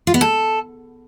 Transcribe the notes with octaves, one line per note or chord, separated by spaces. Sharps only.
F4
B3
A4